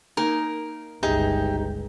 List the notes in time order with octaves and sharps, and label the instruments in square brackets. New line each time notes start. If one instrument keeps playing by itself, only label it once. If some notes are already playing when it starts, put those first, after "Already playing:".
[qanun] A#3 D#4 G#5 [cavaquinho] A#4
[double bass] G1 C#2 [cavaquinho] D#4 [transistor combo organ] G4 [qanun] G#4 E5